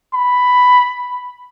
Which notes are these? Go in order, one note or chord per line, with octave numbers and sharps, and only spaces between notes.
B5